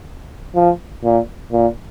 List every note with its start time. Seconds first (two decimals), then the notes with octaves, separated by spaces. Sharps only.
0.55 F3
1.04 A#2
1.52 A#2